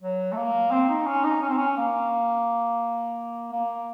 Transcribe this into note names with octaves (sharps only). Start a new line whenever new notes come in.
F#3
A3
A#3
C4
D#4
C#4
D#4
C#4
C4
C#4
A#3
A#3